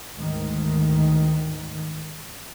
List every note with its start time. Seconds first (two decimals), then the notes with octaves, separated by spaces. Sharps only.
0.14 D2 G#2 D#3